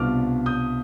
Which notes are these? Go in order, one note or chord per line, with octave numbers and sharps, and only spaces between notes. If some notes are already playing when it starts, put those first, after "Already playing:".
Already playing: C2 B2 B3 D4 F4 D6 F6
D#6 G6